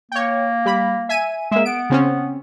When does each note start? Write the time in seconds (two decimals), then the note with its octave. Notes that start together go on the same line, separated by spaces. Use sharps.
0.12 A#3 C#5 G5
0.66 G3 B5
1.09 E5 G#5 D#7
1.51 G#3 A#3 E5
1.65 B3 D7
1.90 C#3 C4 C#4